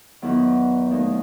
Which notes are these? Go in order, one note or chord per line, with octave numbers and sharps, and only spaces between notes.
E2 D#3 F#3 B3 E4
D#2 D#3 A3